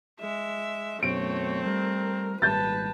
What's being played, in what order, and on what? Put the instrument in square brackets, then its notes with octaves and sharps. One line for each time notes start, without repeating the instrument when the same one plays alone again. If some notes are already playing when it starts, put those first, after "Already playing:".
[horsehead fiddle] G#3 [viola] E5
[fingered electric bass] F#2 B2 [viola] A3 C4 [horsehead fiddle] C#5 [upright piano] D7
[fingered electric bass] G3 [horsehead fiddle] A#4
[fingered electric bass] G#1 A#2 G3 [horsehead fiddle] B4 A5 [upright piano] G6 A6